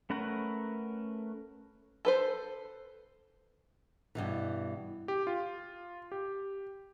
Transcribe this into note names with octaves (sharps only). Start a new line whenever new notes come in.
A3 C#4 A#4 B4 F#5
A4 B4 C5
G2 B2 E3
G4
F4
G4